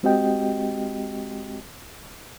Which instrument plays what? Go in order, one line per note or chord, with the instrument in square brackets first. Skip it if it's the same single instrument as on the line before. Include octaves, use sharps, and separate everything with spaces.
[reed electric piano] G#3 C4 F#4 G4 D#5 G5